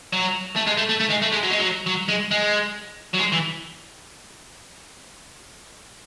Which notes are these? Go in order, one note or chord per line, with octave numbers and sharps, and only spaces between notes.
F#3
A3
G#3
A3
A3
A3
G#3
A3
G#3
F#3
G#3
F#3
F#3
G#3
G#3
F#3
G#3
E3